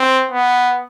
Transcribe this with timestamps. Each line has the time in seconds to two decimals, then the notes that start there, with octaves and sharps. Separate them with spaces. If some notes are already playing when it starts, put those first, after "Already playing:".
Already playing: C4
0.31 B3